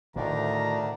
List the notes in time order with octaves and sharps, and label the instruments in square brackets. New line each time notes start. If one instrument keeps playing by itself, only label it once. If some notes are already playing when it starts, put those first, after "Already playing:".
[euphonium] D2 [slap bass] A2 D3 [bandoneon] D#3 D4 [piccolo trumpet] A#5